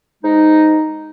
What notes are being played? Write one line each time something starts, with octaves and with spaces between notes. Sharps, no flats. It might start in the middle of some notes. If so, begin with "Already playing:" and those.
G#2 G#3 D#4